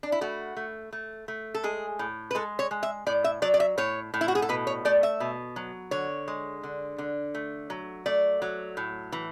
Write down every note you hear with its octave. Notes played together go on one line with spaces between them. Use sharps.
D4
E4
A3 F#4
A3
A3
A3
A4
G#3 G#4
A2
B4
G#3 A4
C#5
G#3
E5
A2 D5
E5
F#3 D5
D5
E5
A2 C#5
A2
E4
F#4
G#4
A4
B2 B4
C#5
A3 D5
E5
B2
F#3
D3 C#5
G#3
D3
D3
A3
F#3
A3 D5
F#3
A2
E3